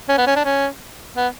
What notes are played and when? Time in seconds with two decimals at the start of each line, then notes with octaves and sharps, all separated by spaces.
0.09 C#4
0.18 B3
0.27 C#4
0.36 D4
0.45 C#4
1.17 B3